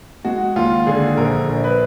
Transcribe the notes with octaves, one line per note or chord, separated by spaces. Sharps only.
G#3 F#4
D#2 F4
D3 G#4
A#1 A#4
A#1
B4